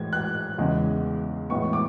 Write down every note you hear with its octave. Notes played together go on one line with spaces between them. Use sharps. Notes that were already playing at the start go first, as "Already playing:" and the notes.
Already playing: A2 E3 G#3 G#6
F#6
E2 C#3 E3 G#3
A2 E3 G#3 B3 C#6
D6